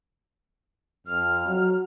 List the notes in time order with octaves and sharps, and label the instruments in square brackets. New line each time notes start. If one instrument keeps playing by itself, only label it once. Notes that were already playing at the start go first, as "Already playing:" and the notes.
[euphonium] F2 [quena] F6
[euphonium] F#3